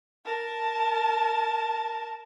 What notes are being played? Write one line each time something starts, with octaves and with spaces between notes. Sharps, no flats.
A#4 A5